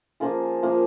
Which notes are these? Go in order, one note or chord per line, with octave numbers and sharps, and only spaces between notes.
F3 A#3 F4 G#4
F3 A#3 F4 G#4